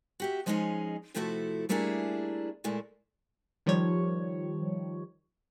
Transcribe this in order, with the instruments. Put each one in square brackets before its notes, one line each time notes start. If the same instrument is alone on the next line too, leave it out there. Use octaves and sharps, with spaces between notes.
[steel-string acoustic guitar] F#4 G4 E5
F3 G#3 C#4 D#4 G#4 D#5
C3 F3 A3 E4 F#4 A4
G3 A3 A#3 D4 E4 G#4
A#2 G#3 A3 E4
[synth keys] D#3 F3 G3 C#5